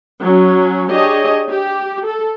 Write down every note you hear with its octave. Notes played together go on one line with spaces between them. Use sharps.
F#3 C#4
D4 G4 G#4 C#5 D#5
G4
A4